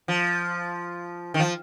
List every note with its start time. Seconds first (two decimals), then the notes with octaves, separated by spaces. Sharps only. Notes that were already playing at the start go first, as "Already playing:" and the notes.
0.08 F3
1.34 D#3
1.40 F3